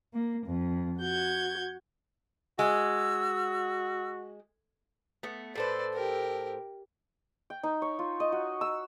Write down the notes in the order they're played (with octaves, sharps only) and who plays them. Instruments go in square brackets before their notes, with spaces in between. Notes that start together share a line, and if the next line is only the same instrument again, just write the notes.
[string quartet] A#3
F2
F#4 G6 G#6
[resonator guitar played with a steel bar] G#3 [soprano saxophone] F#4 [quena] E6
[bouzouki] A3 B3
[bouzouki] A2 A4 C5 [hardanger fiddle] B4 D5
[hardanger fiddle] G4 A#4
[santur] G5
D#4
C#5
F4
D#5
F#4
E6